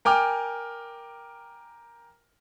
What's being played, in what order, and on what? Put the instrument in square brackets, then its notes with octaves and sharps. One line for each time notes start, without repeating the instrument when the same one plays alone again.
[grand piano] A#4 G5 G#5 D6 F6